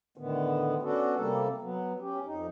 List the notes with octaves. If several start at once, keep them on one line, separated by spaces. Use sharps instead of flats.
A2 D3 D#3 B3
B3 C#4 D4 F#4 A4
C3 G3 A#3 A4
F#3 B3
C#4 G4
F2 D#4